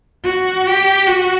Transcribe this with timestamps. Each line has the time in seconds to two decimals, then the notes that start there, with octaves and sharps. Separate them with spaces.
0.24 F#4
0.66 G4
1.07 F#4